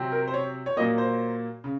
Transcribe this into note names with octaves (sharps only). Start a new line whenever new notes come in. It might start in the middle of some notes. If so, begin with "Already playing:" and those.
Already playing: C3 F#3 C4
A#4
C5
C#5
C#5
A#2 F#3 A#3 D#5
C5
C#3